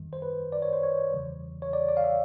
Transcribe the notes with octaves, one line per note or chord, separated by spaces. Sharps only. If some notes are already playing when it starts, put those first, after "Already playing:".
Already playing: F#2 D#3 G3
C5
B4
D5
C#5
C5
C#5
E2 C#3 E3 G3
C#5
D5
D5
F5
E5